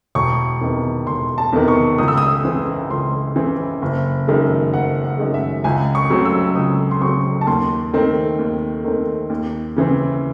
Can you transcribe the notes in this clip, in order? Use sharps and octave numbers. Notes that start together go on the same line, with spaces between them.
E1 C#6
E2 C3 D#3
E1 C6
A5
E2 C3 D#3
C#6
C#2 D#6
E6
D#6
C#3 E3 C4
C#2 C6
C#3 E3 C4
F#1
F#2 D#3 G#3
F#1 F#5
F#5
F#2 D#3 G#3
E5
C#2 G#5
C#6
C#3 F#3 A3 C4
E6
C#2 D#6
C6
C#3 F#3 A3 C4 C#6
A5
D#2 C6
D#3 A3 C4
D#2
D#3 A3 C4
D#2
C#3 E3 C4